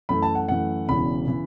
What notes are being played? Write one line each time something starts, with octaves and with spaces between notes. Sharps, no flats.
F#2 E3 A3 B5
A5
F#5
F#2 E3 A3 F#5
E1 E2 C#3 E3 B5
C#3 E3